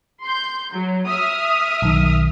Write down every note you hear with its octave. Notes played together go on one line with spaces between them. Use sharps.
C6 G6
F#3
E5 D#6 F6
B1 D#3